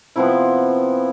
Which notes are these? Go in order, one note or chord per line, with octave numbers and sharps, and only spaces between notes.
C3 F3 B3 E4